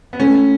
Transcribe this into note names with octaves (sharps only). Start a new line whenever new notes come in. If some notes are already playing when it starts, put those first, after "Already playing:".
B3
A3 C#4